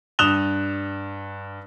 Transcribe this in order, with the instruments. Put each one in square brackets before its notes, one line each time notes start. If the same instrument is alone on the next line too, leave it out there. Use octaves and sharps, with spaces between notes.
[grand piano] G2 D#6 F#6 E7 F7 G7